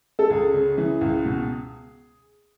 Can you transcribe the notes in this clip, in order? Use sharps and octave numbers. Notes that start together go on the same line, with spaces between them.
A4
C#2 G#4
C#3
E3
C#2
B2